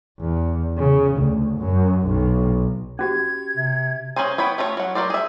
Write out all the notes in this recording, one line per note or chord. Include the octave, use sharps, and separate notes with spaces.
E2
C#3
D2
F#2
B1
C#4 F#4 G4 G#6
C3
C#4 G#4 A#4 C5 G#5
B3 C#5 G5 B5
A3 C#4 F4 A#4 C#5
F#3 F#5
F#3 A#4 C5 D5
G#4 E5